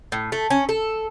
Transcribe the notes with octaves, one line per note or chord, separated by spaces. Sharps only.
A2
A3
C#4
A4